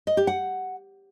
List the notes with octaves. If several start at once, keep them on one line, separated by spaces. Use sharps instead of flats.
D#5
G4
F#5